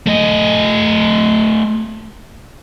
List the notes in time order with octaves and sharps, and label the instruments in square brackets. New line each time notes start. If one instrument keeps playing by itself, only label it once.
[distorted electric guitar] A3 D#5